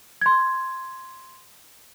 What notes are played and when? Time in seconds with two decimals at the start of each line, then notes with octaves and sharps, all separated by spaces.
0.21 C6 G#6